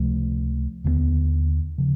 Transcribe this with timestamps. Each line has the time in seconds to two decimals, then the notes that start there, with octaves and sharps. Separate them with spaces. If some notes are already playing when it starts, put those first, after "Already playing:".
Already playing: C#2 C3 F3 A3
0.84 D#2 D3 G3 B3
1.78 C#3 F3